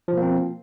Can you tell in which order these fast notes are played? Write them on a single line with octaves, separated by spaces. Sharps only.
F3 B2 A#3 C4